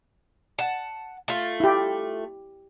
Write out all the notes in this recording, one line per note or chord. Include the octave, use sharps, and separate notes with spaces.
F#5 A5
A3 F4
E4 G4